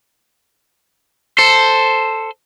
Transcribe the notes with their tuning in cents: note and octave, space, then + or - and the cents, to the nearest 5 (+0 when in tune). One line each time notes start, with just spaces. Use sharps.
A4 +5 C5 +0